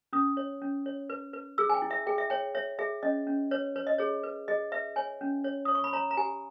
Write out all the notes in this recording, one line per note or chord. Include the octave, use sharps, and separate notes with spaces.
C#4 D#6
C#5
C#4
C#5
B4
B4
G#4 E6
G#5
G5
E4
E5
G#4 G5
E5
C#5 G5
C#5 E5
G#4 E5
C#4 D#5
C#4
B4 C#5
B4 C#5
D#5
G#4 C#5
B4
G#4 D#5
B4 E5
C#5 G#5
C#4
C#5
C#5 D#6
C#6
B5
C#5 A#5
A#5
G4 G#5